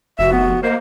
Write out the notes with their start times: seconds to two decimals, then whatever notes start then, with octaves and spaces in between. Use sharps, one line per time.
0.19 F1 F#4 E5
0.32 B3
0.63 A#3 C5 D#5